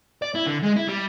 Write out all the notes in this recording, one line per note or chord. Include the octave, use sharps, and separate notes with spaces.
D5
E4
D3
G#3
E4
G3